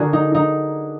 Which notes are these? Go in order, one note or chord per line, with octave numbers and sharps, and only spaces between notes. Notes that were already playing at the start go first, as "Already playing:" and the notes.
Already playing: D3 D4 F#4 G#4 A#4
D#4
D#4